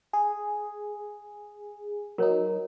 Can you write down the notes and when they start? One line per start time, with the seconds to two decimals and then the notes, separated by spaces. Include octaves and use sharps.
0.13 G#4
2.18 F#3 D#4 A#4 C#5